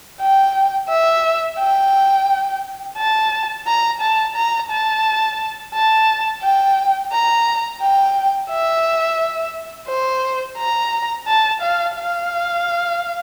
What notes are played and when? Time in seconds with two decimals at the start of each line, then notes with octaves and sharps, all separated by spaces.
0.21 G5
0.90 E5
1.59 G5
2.98 A5
3.67 A#5
4.01 A5
4.36 A#5
4.71 A5
5.75 A5
6.43 G5
7.13 A#5
7.82 G5
8.51 E5
9.89 C5
10.58 A#5
11.28 A5
11.62 F5
11.96 F5